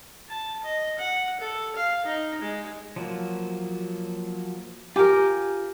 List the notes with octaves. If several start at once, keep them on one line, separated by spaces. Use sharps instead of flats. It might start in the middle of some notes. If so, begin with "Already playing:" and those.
A5
D#5
F#5
A4
F5
D#4
G#3
F3 F#3 A#3
F4 G4 A#4 G#5 F6